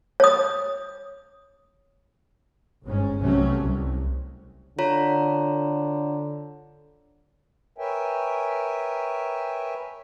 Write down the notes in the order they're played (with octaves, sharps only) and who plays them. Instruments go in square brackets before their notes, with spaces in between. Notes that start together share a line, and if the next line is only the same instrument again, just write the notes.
[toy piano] C#5 D#6
[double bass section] G1 G#2 C#4
B1 C3 F#3 A3 C#4
C2
[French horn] D3 [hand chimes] F4 C#5 A#5
[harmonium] A#4 B4 C#5 E5 G5 G#5